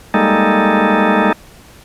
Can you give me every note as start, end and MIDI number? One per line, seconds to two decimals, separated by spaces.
0.14 1.32 55
0.14 1.32 56
0.14 1.32 58
0.14 1.32 63
0.14 1.32 69